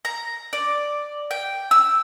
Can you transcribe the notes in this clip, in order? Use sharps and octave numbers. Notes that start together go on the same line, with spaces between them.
A#5
D5
G5
E6